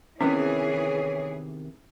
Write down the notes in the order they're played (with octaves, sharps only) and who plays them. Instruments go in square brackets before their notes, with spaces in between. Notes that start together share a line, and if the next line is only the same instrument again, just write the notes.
[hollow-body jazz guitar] C3 D#3 B3 [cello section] E3 G#4 [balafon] C#4 [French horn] C#5